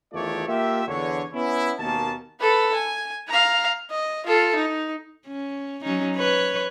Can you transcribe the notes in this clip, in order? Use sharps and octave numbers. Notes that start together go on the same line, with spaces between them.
E2 D#3 A3 F4 C#5 D5
A#3 F4 G4 E5
E2 D3 C#5
B3 C#4 E4
D#2 B2 A#3 B3 C#4 A5
A4 B4
G#5
F5 A#5
D#5
F4 A4
D#4
C#4
F#3 C#4 D#4
B4 C#5